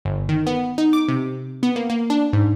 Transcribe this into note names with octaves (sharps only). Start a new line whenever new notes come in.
G1
D#3
B3
D#4
D6
C3
B3
A#3
A#3
D4
G#2